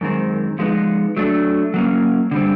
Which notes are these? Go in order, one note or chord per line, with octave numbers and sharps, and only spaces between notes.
F#2 D#3 G#3 C4
F3 G#3 B3 D#4
F#3 A3 D4
F#3 A#3 C#4
D3 G3 C4